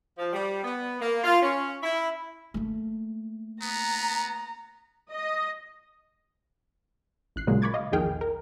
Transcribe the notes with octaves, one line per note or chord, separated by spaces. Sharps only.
F3
G3
B3
A#3
F4
C#4
E4
A3 A#3
B3 A#5
D#5
A1 F#6 C7
A#2 C#3 F#3 G#3 A#3
B5 C#6 D6 G#6 A6
D#5 F5
A#1 E2 D#3 G#4 G5 F6
A#4